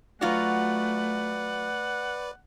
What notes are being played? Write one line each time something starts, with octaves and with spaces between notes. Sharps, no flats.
F#3 A3 F4 F#4 B4 D5 F#5